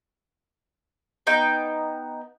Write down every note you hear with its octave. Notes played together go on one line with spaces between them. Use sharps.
B3 D#4 G5